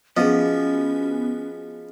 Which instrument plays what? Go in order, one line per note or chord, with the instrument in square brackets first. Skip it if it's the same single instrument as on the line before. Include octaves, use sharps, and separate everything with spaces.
[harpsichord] F3 [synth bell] B3 F#4 B6 [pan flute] C#4 [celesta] G#4 D#5